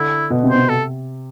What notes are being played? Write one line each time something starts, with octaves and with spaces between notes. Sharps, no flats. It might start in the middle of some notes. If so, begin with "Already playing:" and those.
Already playing: D3 E4
B2
C3
C5
C3
A4